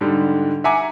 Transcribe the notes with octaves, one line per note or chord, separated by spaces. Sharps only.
G#2 D3 G3
E5 F#5 G#5 A#5 D6